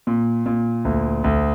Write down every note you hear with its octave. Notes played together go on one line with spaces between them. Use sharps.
A#2
A#2
D2
D2